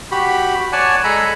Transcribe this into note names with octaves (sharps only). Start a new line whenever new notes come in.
F#4 G4 B5
C#5 D5 F#5 G#5 A5
G#3 A4 G#5 A#5 B5